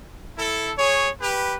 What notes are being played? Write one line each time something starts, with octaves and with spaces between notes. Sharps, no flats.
E4 A4
G#4 C#5
G4 B4